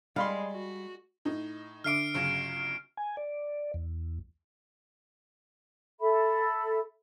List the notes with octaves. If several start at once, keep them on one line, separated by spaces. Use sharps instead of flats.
G3 G#3 F5 B5 C6
F#4
A2 D#4
D3 E5 D6 F6 C7 D7
G1 C#3 F#3
G#5
D5
E2
A4 E5 B5